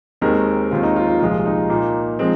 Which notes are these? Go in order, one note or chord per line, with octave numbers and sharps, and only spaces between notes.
D#2 D#3 G#3 C4 A#4
D#2 D#3 G#3 C4 F4
D#4
F4
F4
C2 A#2 F3 G#3 F4
D#4
A#2 A#3
F3 G#3 C4